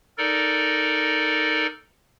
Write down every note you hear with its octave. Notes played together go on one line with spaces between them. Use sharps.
D#4 A4 A#4 D5